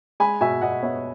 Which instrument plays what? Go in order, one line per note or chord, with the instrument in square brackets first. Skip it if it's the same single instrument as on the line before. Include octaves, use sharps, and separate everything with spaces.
[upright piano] G#3 G#5 B5
B2 E5 G#5
B2 D#5 F#5
B3 C#5 E5